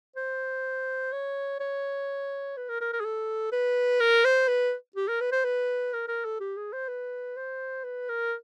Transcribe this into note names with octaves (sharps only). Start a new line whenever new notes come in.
C5
C#5
C#5
B4
A#4
A#4
A#4
G#4
A4
B4
A#4
C5
B4
G4
A#4
B4
C5
B4
A#4
A#4
A4
G4
G#4
C5
B4
C5
B4
A#4